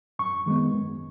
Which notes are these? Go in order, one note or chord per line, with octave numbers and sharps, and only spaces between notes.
F#2 C#6
D#3 G#3 B3
F#2